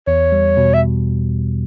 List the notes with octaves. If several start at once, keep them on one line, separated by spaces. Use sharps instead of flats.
E2 C#5
G3
B2
E5